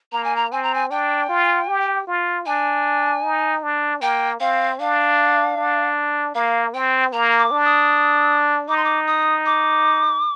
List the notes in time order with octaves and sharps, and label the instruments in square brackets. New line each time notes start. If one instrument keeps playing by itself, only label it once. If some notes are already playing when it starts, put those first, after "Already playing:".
[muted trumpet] A#3 [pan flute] A#5
[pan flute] G#5
A#5
[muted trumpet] C4 [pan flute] G#5
[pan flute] A#5
G#5
[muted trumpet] D4 [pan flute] G5
[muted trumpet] F4
G4
F4
[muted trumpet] D4 [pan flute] G#5
[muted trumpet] D#4
D4
[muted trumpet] A#3 [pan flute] G5
[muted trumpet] C4 [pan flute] F5
[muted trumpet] D4 [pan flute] F5
[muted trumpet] D4
[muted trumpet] A#3 [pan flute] F5
[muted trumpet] C4 [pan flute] G5
[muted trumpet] A#3 [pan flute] A#5
[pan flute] D6
[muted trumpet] D4
[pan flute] D#6
[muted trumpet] D#4 [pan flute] D6
[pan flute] C6
D6
D#6
D6